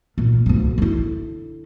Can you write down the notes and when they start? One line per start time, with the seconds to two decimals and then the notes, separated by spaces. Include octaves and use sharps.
0.18 A#2
0.46 D2 C#3
0.78 D3 E4